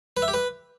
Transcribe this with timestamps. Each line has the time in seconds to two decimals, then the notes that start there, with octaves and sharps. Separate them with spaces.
0.17 B4
0.22 E5
0.28 G4
0.34 B4